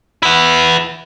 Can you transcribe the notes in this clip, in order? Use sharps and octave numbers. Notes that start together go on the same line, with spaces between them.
B3 E4